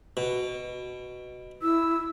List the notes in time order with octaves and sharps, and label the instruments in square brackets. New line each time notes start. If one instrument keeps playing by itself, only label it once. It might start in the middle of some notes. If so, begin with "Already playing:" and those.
[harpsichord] B2
[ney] E4 [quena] E6